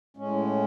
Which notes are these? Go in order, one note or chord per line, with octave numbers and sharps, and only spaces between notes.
A2 G#3 C#4